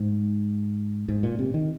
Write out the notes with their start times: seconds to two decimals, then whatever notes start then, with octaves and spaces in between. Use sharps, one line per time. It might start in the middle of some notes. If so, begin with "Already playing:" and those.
Already playing: G#2
1.09 G#2
1.23 A#2
1.39 C3
1.54 D#3